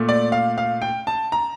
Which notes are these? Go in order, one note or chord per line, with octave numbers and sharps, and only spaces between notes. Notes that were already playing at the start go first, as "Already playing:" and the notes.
Already playing: A#2 A3
D5
F5
F5
G5
A5
A#5